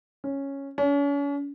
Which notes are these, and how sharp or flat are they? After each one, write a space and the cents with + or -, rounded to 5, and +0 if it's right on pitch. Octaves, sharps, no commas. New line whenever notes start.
C#4 -5
C#4 +40